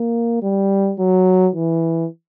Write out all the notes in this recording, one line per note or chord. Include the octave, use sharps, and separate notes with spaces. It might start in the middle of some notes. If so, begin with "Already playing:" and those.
Already playing: A#3
G3
F#3
E3